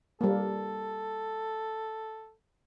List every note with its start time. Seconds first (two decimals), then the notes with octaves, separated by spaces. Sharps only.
0.21 G3 A#3 A4